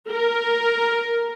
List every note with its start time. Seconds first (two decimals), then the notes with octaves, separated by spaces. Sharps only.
0.12 A#4